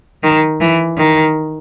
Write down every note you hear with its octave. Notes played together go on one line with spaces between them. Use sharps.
D#3
E3
D#3